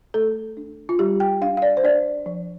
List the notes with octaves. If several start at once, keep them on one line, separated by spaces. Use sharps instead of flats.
A3 A4
D4
F4
G3 G4
G5
D4 F5
F5
D5
C5
D4 D5
F3